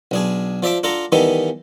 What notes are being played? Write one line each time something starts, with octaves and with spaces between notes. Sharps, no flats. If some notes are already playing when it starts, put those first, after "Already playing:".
B1 D4 G#4
F3 D5 E5 A5 D6
D4 F4 A4 F#5 A#5
D#3 E3 G3 B3 D#4 A4